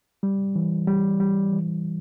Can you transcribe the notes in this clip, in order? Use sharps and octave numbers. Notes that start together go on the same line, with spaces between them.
G3
E3
G3
G3
E3